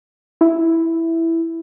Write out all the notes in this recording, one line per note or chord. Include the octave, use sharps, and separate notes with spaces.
E4